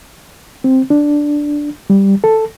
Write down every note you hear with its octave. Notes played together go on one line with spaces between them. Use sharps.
C4
D4
G3
A4